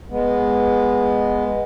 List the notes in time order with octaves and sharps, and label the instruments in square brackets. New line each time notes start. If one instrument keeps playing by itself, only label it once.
[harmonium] G#3 B3